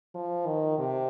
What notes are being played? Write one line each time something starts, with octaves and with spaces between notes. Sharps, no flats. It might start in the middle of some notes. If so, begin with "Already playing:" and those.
F3
D#3
C3